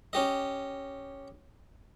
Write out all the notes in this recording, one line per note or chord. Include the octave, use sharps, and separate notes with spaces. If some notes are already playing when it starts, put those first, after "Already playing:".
C#4 G4 D#5